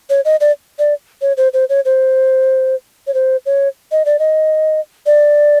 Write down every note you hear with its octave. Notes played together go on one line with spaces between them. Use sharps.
C#5
D#5
D5
D5
C#5
C5
C5
C#5
C5
C#5
C5
C#5
D#5
D5
D#5
D5